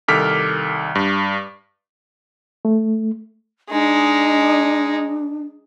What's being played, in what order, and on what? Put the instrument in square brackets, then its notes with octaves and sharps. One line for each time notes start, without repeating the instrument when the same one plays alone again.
[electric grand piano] C2 D#3 A4 D6 F6 B6
G2
[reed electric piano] A3
[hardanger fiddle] G#3 D#4 [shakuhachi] D4